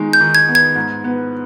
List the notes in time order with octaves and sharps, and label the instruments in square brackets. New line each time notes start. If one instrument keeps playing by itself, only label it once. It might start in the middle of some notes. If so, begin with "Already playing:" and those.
Already playing: [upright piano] D#3 G#3 B3 D#4
[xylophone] G6
[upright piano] D#3
[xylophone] G#6
[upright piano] B3
[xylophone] G#6
[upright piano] G#2
B3